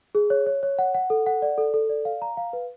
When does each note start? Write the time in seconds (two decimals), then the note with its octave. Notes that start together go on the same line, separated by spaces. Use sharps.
0.15 G#4
0.30 C#5
0.46 C#5
0.63 C#5
0.79 F#5
0.94 F#5
1.10 A4
1.26 F#5
1.42 D5
1.58 A4
1.74 A4
1.89 D5
2.05 F5
2.22 A#5
2.37 F5
2.53 B4